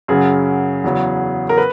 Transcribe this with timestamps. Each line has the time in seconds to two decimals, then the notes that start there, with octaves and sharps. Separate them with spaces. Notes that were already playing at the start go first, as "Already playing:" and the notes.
0.08 F#2 C#3 F#3 G#4
0.84 E2 C#3 F#3
1.49 A#4
1.58 B4